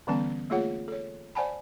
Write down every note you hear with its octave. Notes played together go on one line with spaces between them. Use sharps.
D3 E3 G3 B3 C#4 A5
A3 A#3 F4 G#4 C#5 F#5
A4 C#5
C5 D5 F#5 G#5 A5 B5